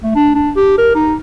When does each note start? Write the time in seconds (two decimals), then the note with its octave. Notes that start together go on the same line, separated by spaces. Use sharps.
0.03 A3
0.15 D4
0.35 D4
0.56 G4
0.78 A#4
0.95 D#4